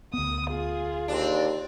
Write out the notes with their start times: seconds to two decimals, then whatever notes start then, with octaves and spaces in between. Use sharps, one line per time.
0.14 D2 B3 D#6
0.50 F4 G#4
1.08 D#2 C4 D4